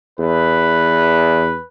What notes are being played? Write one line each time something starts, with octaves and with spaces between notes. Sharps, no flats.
E2 B4